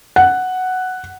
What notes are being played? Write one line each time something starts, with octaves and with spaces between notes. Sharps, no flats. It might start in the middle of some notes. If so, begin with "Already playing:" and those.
F#5